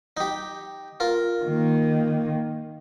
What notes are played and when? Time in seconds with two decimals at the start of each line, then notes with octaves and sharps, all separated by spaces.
0.17 D#4 G4
1.00 F4 A#4
1.43 D#3 A#3